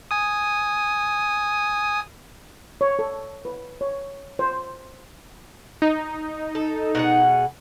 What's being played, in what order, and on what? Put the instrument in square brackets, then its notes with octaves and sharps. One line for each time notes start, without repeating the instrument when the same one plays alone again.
[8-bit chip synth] G#5 D#6
[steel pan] C#5
A4
B4
C#5
C5
[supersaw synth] D#4
[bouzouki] A4
B2 G#4 F#5